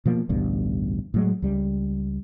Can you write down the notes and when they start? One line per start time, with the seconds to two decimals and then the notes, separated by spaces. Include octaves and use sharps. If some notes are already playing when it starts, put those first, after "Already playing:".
0.06 B2 F3 A#3
0.29 A1 D2 G2 B2
1.14 A2 F#3 G#3
1.42 C#2 G3